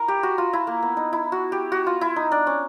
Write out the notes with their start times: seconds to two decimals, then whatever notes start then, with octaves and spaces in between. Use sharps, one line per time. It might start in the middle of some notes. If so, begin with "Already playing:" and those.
Already playing: E4 A#4
0.08 G4
0.23 F#4
0.38 F4
0.53 E4
0.67 A#3
0.83 B3
0.97 D#4
1.13 E4
1.32 F#4
1.52 G4
1.72 F#4
1.87 F4
2.01 E4
2.16 D#4
2.32 D4
2.47 C#4